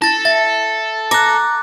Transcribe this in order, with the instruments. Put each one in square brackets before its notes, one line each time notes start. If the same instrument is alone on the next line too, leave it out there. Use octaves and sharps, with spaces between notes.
[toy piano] E4 [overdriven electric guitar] A4 [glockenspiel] A6 A#6
[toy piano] E5 [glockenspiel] A6
[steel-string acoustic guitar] A#5 [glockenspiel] D6 F#6